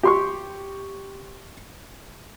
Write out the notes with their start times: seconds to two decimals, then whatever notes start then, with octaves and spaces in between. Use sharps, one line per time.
0.03 G4 C6 C#6